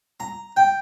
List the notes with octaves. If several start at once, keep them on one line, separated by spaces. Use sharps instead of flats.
A#5
G5